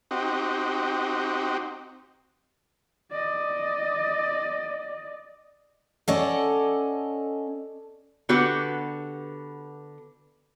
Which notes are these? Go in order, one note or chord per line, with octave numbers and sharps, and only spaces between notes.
C4 D#4 F#4 G4
D5 D#5
C#4 A4 D5 D#5 F#5
D3 B3 F#4 G4 B4